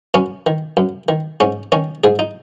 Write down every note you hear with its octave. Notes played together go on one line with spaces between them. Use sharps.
F#2 C#4
D#3
F#2
D#3
G#2 C#4
D#3 C#4
G#2 G#4
D#4